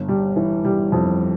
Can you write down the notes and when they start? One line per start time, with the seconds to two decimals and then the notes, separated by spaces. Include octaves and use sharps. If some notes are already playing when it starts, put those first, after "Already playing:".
Already playing: G1
0.08 G3
0.36 E3
0.64 G3
0.92 F2